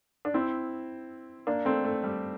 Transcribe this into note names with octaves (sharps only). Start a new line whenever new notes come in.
D4
C4 E4
A#3 D4
A3 C4
A3
G3